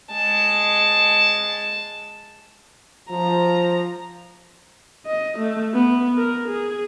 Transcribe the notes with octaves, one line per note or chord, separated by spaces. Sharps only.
G#3 A5
F3 A#5
D#5
A3
B3
A#4
G#4